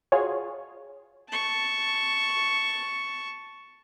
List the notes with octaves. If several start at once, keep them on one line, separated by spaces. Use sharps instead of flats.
F4 F#4 G#4 C#5
A5 C#6